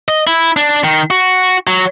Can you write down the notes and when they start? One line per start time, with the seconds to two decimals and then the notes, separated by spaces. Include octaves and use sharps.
0.08 D#5
0.27 E4
0.57 D4
0.84 D#3
1.10 F#4
1.67 F#3